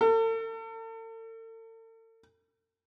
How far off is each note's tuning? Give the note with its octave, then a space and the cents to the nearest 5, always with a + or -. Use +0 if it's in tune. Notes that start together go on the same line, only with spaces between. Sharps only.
A4 +45